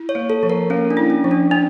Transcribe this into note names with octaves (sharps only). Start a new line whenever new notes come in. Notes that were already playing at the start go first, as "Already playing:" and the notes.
Already playing: E4
C#5
A#3
A4
F3
A#4
A#3 C#4
D4
E4
C#4
F3
D4
C#4 D4